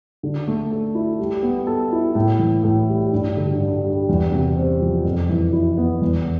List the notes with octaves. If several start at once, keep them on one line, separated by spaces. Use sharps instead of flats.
D3
A3
A4
E4
G3
B3
A4
E4
A2
E3
A2
G3
G2
D3
G2
G3
E2
C3
C4
F3
F2
E3
E4
B3
E2